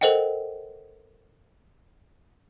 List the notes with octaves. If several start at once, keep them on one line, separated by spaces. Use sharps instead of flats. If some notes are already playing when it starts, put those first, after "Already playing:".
A4 A#4 C5 D#5 F#5 G5